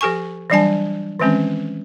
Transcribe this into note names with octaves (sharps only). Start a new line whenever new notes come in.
F3 G4 A4 G#5 C#6
E3 F#3 G3 D4 G#5 A5
D#3 E3 G#3 C4 C#4